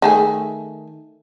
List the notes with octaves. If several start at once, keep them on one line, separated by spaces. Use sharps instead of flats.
D#3 A3 G#4